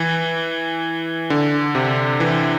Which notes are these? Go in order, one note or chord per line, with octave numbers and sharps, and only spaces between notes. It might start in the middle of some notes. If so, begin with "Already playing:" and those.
Already playing: E3
D3
C3
E3